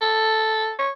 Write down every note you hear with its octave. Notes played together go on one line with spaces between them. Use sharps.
A4
C#5